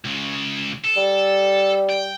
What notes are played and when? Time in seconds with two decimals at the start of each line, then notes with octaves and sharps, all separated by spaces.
0.05 C#2 C#3
0.84 A4
0.97 G3
1.90 G5